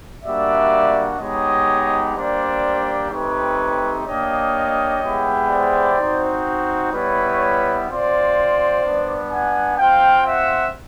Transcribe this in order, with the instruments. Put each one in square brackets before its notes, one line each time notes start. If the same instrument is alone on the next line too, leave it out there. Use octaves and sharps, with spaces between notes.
[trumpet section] G3 A#3 D4 F#4 D5 E5
G#3 B3 D#4 G4 C#5 D#5
G3 A#3 D4 G4 C5 D5
A3 C4 D#4 G4 B4 C#5
A#3 D4 G4 C#5 D#5
G#3 B3 E4 G4
C5 D5
C4 D#4 F#4
G3 B3 E4 B4 C#5
C4 F4 C5 D5
G3 B3 D4
F#5 G#5
C4 F4 F5 G5
E5 F#5